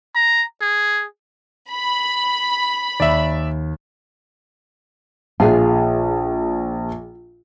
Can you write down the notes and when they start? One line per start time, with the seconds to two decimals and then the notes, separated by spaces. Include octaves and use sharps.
0.15 A#5
0.61 G#4
1.72 B5
3.00 D#2 D5 E5
5.40 A#1 F4 G#4